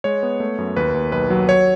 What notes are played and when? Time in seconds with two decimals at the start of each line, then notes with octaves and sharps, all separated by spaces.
0.04 G#3 C#5
0.23 B3
0.40 A3
0.58 F#2
0.76 D#2 B4
0.94 D#2
1.12 B1 B4
1.30 F#3
1.48 F#3 C#5